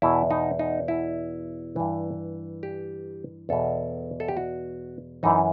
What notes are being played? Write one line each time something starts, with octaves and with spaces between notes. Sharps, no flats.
E2 B2 E4
D#4
D#4
E4
G2 E3
G4
E2 B2 A4
A4
G4
F#4
F#2 E3 D#4